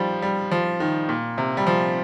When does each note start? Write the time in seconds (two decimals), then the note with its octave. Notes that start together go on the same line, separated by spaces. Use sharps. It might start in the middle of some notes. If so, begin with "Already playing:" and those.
Already playing: D#3 F3 G3
0.22 G3
0.51 F3
0.80 D#3
1.09 A#2
1.38 C3
1.57 G3
1.67 F3